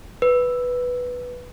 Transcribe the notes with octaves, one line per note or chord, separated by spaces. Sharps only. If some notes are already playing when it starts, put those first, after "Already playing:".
B4